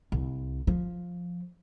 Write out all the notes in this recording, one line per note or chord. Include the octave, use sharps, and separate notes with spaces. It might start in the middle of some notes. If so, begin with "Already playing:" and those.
C2
F3